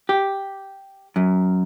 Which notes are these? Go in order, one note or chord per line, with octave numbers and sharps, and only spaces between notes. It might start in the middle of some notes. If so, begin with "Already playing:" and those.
G4
F#2